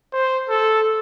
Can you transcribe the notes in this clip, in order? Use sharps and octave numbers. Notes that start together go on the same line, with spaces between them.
C5
A4